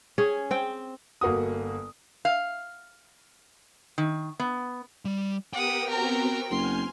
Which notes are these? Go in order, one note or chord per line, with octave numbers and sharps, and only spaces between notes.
C#4 G#4
C4 G5
G1 A#3 F#4 D#6
F5
D#3
B3
G3
B3 G4 A#4 F#5 G5 D#6
B3 C4 F#4 A#4 A#5
F#1 G#5 C6 F6